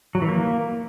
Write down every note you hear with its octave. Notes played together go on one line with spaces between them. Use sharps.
F#3
E3
A#3